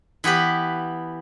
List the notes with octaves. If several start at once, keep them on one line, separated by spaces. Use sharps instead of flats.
E3 B3 G4 B4